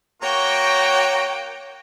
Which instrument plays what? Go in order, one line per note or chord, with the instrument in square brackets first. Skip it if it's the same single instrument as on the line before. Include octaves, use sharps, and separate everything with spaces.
[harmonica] A#3 F#4 A#5 [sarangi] C#5 [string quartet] G5